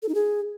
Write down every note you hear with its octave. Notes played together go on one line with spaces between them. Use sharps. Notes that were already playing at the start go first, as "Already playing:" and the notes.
A4
D#4
G#4